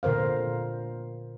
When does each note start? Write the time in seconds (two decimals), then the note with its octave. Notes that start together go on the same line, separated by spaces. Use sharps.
0.03 A#2 D3 A#4 C5 F5